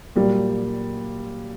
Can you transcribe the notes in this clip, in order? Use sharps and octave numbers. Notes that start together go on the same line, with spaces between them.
A#2 F#3 G3 A#3